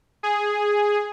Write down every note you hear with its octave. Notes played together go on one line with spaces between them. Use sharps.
G#4